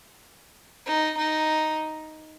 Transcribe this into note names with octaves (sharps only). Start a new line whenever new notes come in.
D#4
D#4